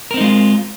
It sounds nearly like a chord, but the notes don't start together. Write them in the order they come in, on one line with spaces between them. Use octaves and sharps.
A#4 C4 D#4 G#3 F4